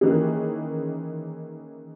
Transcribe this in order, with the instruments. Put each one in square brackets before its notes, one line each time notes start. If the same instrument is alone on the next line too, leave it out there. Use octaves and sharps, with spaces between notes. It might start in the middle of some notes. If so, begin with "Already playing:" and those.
[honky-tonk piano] D#3 E3 A#3 C#4 G#4